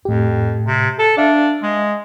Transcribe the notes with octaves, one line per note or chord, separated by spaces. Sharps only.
F2 A2 G4
C3
A4
D4 D5 E5 F5
G#3